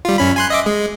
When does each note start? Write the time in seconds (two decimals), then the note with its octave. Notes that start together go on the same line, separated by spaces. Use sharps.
0.05 G3 F4
0.18 F#2 C#4 B5
0.36 G#5 C6 F#6
0.50 D#5 E5 D6
0.66 G#3